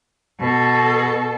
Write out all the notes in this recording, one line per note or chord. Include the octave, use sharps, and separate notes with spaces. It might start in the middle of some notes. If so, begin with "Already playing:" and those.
B2 A4